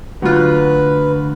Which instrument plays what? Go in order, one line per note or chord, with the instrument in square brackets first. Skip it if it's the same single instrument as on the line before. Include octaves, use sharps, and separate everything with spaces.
[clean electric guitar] D2 [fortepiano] F#3 F4 [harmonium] B4